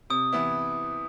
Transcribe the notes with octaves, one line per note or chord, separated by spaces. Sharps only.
C3 D#6
E3 B3 E4